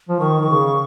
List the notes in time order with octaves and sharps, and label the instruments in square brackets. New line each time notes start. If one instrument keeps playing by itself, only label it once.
[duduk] F3
[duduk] D#3 [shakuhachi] C#6
[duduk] D#3
C#3